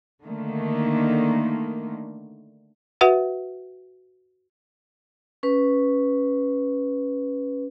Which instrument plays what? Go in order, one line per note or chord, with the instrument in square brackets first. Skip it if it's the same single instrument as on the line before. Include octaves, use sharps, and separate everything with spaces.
[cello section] D3 D#3 A3 A#3
[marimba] F#4 B4 E5 F#5
[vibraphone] C#4 B4